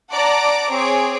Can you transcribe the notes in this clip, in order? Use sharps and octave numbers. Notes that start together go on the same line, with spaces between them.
D5 F#5 A5 A#5 D6
C4 G#4 C#5 D6